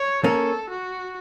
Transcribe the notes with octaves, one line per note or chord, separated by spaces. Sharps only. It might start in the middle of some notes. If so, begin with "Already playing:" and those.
Already playing: C#5
A#3 C#4 A4
F#4